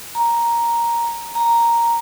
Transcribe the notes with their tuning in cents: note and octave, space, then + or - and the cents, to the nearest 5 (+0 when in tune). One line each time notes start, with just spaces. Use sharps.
A#5 +5
A#5 +0